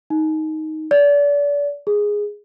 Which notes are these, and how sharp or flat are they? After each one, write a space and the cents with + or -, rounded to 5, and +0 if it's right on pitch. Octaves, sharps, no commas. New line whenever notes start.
D#4 +10
D5 -35
G#4 -5